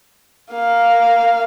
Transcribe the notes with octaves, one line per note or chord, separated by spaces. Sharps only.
A#3 F5